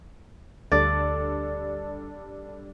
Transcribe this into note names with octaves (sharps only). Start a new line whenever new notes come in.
D2 G3 D4 A4 D5